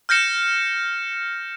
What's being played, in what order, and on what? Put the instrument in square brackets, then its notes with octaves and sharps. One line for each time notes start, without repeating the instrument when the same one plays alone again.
[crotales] F6 G6 A#6 C#7 E7